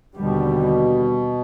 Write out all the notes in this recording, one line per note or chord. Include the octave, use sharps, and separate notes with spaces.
D#2 B2 D3 G3